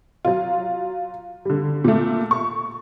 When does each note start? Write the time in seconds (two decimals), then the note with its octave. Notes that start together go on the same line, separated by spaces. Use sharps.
0.25 F#3 F4
1.45 D3 G3
1.84 A#2 A3
2.31 C#6